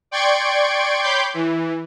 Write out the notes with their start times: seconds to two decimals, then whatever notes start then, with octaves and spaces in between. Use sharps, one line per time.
0.11 D5 G5 C6 C#6 G#6 D7
1.01 C#5 G5 B5 C6 D6 G6
1.34 E3